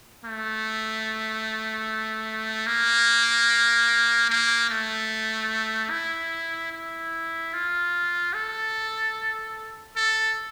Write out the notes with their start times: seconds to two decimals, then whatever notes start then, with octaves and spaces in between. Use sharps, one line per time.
0.24 A3
2.67 A#3
4.29 A#3
4.69 A3
5.90 E4
6.72 E4
7.53 F4
8.34 A4
9.96 A4